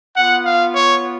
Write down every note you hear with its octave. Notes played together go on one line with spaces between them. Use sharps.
B3 F4 F#5
F5
C#5